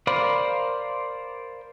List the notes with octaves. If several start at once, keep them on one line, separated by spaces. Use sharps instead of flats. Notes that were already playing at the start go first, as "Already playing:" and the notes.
A#4 C5 D5 F5 B5